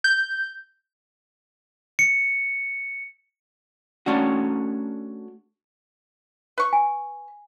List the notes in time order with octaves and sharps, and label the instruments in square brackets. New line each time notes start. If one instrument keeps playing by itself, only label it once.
[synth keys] G6
[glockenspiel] C#7
[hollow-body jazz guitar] A3 C#4 D4 F#4
[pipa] B4 C#6
[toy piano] G#5